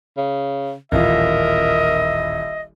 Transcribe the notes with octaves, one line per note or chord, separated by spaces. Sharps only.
C#3
D#1 A1 F4 A#4 D#5 E5